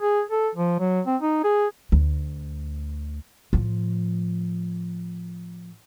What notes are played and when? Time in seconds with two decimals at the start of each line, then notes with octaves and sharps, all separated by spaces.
0.01 G#4
0.31 A4
0.55 F3
0.80 F#3
1.06 C4
1.22 D#4
1.44 G#4
1.92 D2
3.53 A2 F3